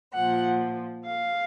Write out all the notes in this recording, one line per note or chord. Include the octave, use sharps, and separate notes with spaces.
A#2 F3 F#5
F5